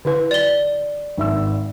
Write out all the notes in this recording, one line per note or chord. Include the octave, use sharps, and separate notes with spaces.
D3 E4 B4
D5 G7
G#1 E5 E6